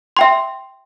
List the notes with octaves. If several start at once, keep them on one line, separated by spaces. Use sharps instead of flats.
E5 G5 C6